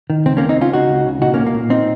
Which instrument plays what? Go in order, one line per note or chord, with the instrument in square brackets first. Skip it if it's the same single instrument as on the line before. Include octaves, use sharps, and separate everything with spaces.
[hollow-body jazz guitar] D#3
C#2 C4
A#3 C#4
C#2
C4 D#4
C#2 C#4 F4
C#3 D#4 F#4
C#2
C#3
A#2 D#4 F#4
A#3 C#4
A#2
A#3
A#2
C4 D#4